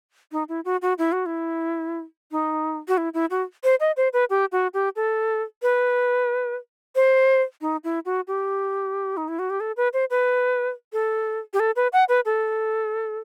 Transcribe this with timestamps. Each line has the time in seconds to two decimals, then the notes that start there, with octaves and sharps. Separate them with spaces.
0.32 D#4
0.49 E4
0.65 F#4
0.82 F#4
0.98 E4
1.12 F#4
1.26 E4
2.32 D#4
2.88 F#4
2.97 E4
3.14 E4
3.31 F#4
3.64 C5
3.80 D#5
3.97 C5
4.13 B4
4.30 G4
4.52 F#4
4.74 G4
4.96 A4
5.62 B4
6.96 C5
7.61 D#4
7.84 E4
8.05 F#4
8.27 G4
9.17 D#4
9.28 E4
9.39 F#4
9.50 G4
9.60 A4
9.77 B4
9.93 C5
10.10 B4
10.93 A4
11.53 G4
11.60 A4
11.76 B4
11.93 F#5
12.09 B4
12.25 A4